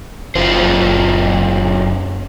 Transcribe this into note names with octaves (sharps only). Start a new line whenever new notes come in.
F#1 F#2 F4 C5